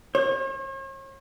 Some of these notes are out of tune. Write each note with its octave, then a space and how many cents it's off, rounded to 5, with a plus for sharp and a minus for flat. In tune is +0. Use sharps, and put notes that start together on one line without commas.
C#5 -45